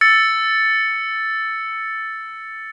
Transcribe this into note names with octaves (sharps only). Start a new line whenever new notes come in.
E6 A6 C#7